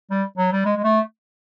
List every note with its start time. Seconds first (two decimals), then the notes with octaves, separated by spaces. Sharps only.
0.11 G3
0.38 F#3
0.52 G3
0.65 G#3
0.76 G#3
0.84 A3